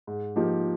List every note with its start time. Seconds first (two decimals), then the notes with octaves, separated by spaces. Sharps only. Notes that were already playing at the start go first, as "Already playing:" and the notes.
0.07 G#2
0.36 F3 A#3 D#4 G4